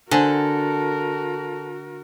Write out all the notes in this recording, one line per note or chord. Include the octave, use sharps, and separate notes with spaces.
D3 F#4 A4 A#4 C5 G#5 A5